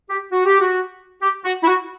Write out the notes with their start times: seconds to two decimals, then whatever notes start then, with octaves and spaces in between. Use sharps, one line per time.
0.09 G4
0.32 F#4
0.46 G4
0.61 F#4
1.22 G4
1.45 F#4
1.63 E4
1.67 F#4